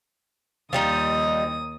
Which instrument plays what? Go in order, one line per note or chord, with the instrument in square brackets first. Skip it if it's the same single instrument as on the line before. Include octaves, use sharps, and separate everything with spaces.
[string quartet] D#2 D#6 [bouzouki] F3 G3 D#4